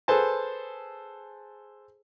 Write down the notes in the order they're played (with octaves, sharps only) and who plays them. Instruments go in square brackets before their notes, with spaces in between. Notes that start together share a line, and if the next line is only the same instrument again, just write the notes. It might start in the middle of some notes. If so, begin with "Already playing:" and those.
[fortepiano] G#4 A4 B4 C5 G#5 A5